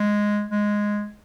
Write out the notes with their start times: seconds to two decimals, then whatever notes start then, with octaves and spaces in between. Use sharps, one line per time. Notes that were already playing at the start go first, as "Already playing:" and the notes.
Already playing: G#3
0.51 G#3